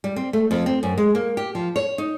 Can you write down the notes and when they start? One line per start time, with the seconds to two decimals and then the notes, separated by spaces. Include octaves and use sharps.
0.04 G3
0.16 C4
0.33 A3
0.51 F2
0.66 C4
0.83 F#2
0.98 G#3
1.15 A#3
1.37 G4
1.55 F3
1.76 C#5
1.98 D#4